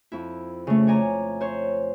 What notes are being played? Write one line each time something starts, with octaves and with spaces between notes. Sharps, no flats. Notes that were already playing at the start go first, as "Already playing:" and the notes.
F2 E4
C#3 A3
C#5 D5 G#5 A#5
C5 C#5